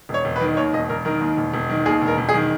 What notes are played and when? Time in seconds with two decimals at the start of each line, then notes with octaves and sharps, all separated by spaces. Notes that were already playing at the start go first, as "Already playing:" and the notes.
0.09 E1 C#5
0.25 E1
0.36 B4
0.41 D#3
0.57 D#2 C#5
0.73 E1 D#5
0.89 E1 A#4
1.05 D#3 A#4
1.21 D#2
1.37 E1
1.54 E1
1.70 D#3
1.86 D#2 G#4
2.02 E1
2.07 A#4
2.18 E1
2.29 G#4
2.34 D#3